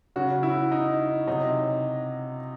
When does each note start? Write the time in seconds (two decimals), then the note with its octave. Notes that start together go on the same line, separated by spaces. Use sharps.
0.16 C#3 F#3 F#4
0.43 E4
0.72 D#4
1.27 C3 F#3 D#4